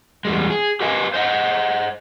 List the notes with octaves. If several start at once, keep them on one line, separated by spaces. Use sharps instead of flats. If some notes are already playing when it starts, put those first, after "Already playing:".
E2 G3 G#3
G#4
G4 B4 D#5 F5 G#5
C5 D#5 F#5